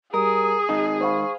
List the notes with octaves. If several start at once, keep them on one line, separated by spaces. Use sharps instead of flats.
G3 G#4 A#4 D#6
G#2 D#3 D#4 D#5 D#6
C5 F5 B5 C#6